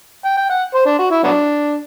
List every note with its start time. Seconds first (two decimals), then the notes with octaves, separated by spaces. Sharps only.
0.25 G5
0.37 G5
0.50 F#5
0.74 C5
0.86 D4
0.99 F#4
1.10 E4
1.24 F#3 B3 D4